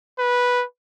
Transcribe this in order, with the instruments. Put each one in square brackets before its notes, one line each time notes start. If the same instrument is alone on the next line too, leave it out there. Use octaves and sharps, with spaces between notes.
[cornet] B4